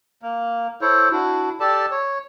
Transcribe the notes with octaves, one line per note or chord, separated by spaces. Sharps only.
A#3
E4 A4 C5 C#5
D4 E4 F#4
G4 A4 D5 A5
C#5